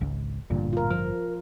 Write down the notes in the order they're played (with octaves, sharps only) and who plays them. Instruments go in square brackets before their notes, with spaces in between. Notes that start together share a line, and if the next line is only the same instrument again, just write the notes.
[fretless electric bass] G#1 C#2
[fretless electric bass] A1 G2 D3 [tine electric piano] A#2
[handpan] F4 A#4
[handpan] F3 [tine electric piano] A#4